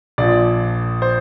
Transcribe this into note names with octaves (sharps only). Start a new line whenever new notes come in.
A#1 A#2 F3 D5
C5